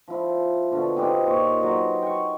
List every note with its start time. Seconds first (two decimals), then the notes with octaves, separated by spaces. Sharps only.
0.08 F3 E4
0.71 B2 D3 F4
0.96 C4 D#4 G4 B4
1.26 A#2 C5 C#5
1.59 F#3 F#4 B4 C5
2.02 G5 C#6